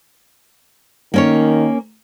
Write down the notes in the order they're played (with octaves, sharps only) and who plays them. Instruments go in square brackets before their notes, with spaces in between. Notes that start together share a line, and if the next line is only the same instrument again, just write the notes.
[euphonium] D#3 [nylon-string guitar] A#3 C#4 C#5